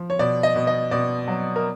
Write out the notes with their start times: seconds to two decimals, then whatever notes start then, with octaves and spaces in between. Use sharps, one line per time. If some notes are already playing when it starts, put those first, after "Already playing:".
Already playing: F3
0.10 C#5
0.19 B2 D5
0.43 D#5
0.56 B2
0.67 D#5
0.91 B2 D5
1.28 F#3
1.56 A#4